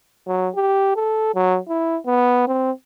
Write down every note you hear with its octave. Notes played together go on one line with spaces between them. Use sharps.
F#3
G4
A4
F#3
E4
B3
C4